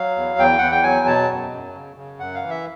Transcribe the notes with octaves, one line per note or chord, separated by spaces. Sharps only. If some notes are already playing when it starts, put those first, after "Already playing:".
Already playing: F#3 F5
E2
E2 G5
E2 F#5
G5
F#3 G#5
B2 A5
F#2
F#2
C#3
C#3
F#2 F#5
F5
E3
E5